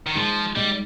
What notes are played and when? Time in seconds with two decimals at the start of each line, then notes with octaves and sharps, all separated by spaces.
0.06 D#3
0.15 A#2 F3 G#3 D#4
0.56 A#2 G3 G#3 D#4